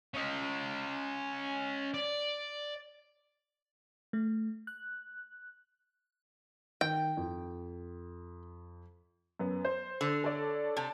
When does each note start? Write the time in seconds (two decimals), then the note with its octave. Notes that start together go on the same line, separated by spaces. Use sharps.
0.14 C#4 D#5
1.94 D5
4.13 A3
4.67 F#6
6.81 D#3 G5
7.17 F2
9.39 F#2 B3
9.65 C5
10.01 D3
10.24 A4 C#5 D5
10.77 C3 A5